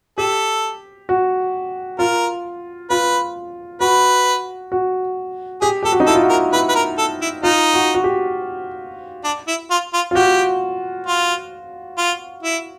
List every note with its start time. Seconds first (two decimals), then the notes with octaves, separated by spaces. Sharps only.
0.18 G4 A4
1.09 F#4
1.99 F4 A#4
2.90 F4 B4
3.81 F#4 B4
4.72 F#4
5.61 G4 G#4
5.83 G4 A4
5.92 F#4
6.00 D#4
6.07 E4 A4
6.15 F4
6.22 F#4
6.29 A#4
6.53 E4 B4
6.69 B4
6.75 A#4
6.98 A4
7.21 E4
7.43 D#4 F4
7.74 F#4
7.94 F#4
8.04 G4
9.24 D4
9.48 E4
9.70 F4
9.93 F4
10.11 F4
10.15 F#4 G4
11.07 F4
11.98 F4
12.43 E4